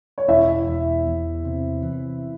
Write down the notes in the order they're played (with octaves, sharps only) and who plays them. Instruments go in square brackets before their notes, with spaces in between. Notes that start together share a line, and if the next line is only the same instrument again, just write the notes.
[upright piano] C#5
[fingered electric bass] E1 [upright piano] E4 E5
[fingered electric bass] E2
E2
C3
E3